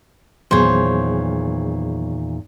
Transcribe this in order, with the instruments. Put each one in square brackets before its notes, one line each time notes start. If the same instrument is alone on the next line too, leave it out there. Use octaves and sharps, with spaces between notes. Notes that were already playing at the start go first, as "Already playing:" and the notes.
[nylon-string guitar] E2 A#2 D#3 [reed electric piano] F#3 B3 G#4 [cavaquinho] C5 C#5